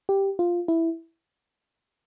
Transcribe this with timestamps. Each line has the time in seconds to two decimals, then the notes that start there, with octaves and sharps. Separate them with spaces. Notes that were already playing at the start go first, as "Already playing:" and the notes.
0.09 G4
0.39 F4
0.68 E4